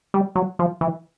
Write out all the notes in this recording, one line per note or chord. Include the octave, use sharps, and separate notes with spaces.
G3
F#3
F3
E3